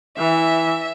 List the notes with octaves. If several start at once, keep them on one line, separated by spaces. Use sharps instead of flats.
E3 E5